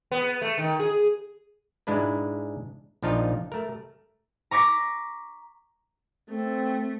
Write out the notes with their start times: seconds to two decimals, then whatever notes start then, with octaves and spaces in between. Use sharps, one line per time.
0.11 B3
0.42 A3
0.57 D#3
0.80 G#4
1.87 G#2 G#3 D4 E4 B4
3.02 A#1 F3 D4 D#4 F4 F5
3.52 A3 A#4
4.51 A#5 C#6 D6 A#6 B6
6.31 A3 C4